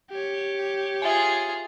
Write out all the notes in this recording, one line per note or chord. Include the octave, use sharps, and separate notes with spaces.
G4 C#5
F4 G#4 E5 G#5